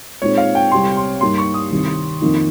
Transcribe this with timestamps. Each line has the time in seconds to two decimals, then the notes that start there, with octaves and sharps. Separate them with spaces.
0.22 A#2 G#3 C4 D#4 C#5
0.38 F5
0.55 G5
0.71 C2 C3 G3 C4 C6
0.97 C6
1.21 G2 G3 A#3 D#4 C6
1.38 C#6
1.54 D#6
1.71 C2 C3 D#3
2.22 F2 D#3 A#3 D#4